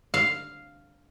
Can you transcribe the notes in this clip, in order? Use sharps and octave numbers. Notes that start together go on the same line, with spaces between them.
F5